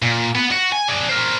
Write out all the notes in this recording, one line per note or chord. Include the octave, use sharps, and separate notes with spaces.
A#2
B3
F#4
G#5
D4 G#4
A#4 C5